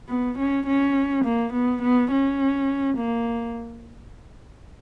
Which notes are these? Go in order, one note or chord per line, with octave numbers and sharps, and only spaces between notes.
B3
C#4
C#4
A#3
B3
B3
C#4
A#3